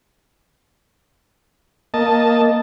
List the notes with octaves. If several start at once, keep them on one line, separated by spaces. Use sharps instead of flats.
A#3 D#5 A5